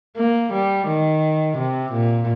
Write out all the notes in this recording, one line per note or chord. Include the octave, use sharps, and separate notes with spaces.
A#3
G3
D#3
C3
A#2